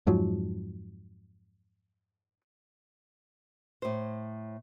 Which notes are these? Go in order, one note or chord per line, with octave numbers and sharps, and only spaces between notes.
F2 G#2 F3 F#3
A2 C5